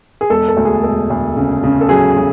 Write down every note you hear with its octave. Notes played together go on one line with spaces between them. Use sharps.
G#4
E1 A4
A4
D2
G#4
E1 A4
D2
C#3
C#3
A4
F#3 G#4
F#3